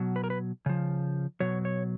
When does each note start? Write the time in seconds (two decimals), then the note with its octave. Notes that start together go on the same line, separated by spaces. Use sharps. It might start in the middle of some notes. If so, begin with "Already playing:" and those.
Already playing: B2 F#3
0.16 B4
0.24 A#4
0.30 B4
0.66 C#3 F3
1.40 B2 F#3 C#5
1.65 C#5